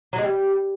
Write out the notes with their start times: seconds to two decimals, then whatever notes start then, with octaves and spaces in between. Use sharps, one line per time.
0.13 F#3
0.18 G#3
0.23 G3